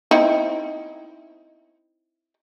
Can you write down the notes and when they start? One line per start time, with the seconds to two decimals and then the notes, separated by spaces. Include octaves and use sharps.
0.11 C4 D#4 E4